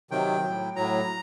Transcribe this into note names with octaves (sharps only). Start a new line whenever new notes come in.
C3 D#3 F#3 G5
A2 F#3
A2 F#3 A#5